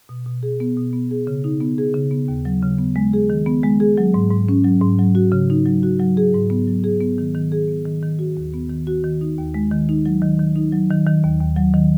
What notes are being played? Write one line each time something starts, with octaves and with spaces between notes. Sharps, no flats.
B2
B2
G#4
B3
B2
B3
G#4
C#3
D#4
B3
G#4
C#3
B3
D#2
F#3
C#3
B3
G#3
G#4
D#3
B3
G#3
G#4
F#3
G#2
G#2
C#4
F#3
G#2
F#3
F#4
C#3
D#4
F#3
F#4
F#3
G#4
G#2
B3
F#3
G#4
B3
D#3
D#3
G#4
B3
D#3
D#3
F#4
D#2
B3
D#3
F#4
D#3
D#4
D#2
G#3
D#3
D#4
F#3
D#3
D#3
D#4
F#3
D#3
D#3
D#2
D#2
F#3
D#3